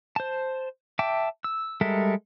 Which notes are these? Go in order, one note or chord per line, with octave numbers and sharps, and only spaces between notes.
C5 A5
E5 G5 A5 D6
E6
G3 G#3 A4 A#4 E5